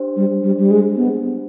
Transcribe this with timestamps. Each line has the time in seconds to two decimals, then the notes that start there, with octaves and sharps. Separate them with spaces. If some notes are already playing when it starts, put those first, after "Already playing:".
Already playing: D4 G4 C5
0.16 G3
0.43 G3
0.58 G3
0.71 G#3
0.97 B3